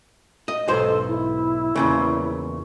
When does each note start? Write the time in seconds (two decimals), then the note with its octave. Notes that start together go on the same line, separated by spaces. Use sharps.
0.48 D#5
0.68 B1 G#2 A4 C5
1.08 E4
1.76 E2 A#2 C#3